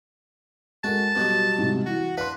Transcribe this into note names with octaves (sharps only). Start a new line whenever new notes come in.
G#3 F#4 A4 A#4 A5
G2 B2 F#3 B3
G#2 C3
E3 F#4
D4 B4 F5 C6